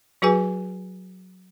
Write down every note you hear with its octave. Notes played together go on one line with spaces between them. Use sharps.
F#3 F#4 G#4 B4 G#5